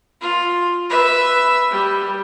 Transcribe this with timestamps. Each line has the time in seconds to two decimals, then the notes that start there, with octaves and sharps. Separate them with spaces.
0.21 F4
0.90 B4 E5
1.71 G3